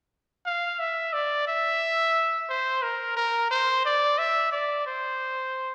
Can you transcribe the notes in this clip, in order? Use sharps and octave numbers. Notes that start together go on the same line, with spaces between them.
F5
E5
D5
E5
C5
A#4
A#4
C5
D5
E5
D5
C5